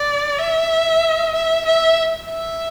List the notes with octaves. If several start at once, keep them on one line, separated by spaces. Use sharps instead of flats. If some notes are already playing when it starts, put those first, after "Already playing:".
Already playing: D5
E5
E5
E5
E5